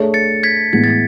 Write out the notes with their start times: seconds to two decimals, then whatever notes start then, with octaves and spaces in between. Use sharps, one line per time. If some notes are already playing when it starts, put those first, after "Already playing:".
Already playing: A3 D4 G#4 C#5
0.14 A6 C#7
0.43 G#6 B6
0.73 A2 E3 G#3 B3 G#6
0.84 A6